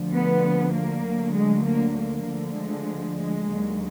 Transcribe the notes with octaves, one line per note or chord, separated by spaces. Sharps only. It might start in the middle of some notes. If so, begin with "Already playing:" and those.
Already playing: D2 D3 F3
B3
A#3
D2 D3 F#3
G#3
A#3
A#3
D2 D3 F3
G#3
G#3
D#2 D3 F#3